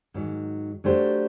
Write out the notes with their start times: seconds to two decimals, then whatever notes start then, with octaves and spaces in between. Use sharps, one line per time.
0.14 G#2 D#3 F#3
0.84 F#3 A3 D4 G4 C5